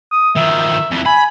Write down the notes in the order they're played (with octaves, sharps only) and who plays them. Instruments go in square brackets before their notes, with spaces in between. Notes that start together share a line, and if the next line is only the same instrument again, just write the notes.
[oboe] D#6
[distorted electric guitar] D#3 F3 [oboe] E5
[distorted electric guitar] F2 E3
[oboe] G#5 [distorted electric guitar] B5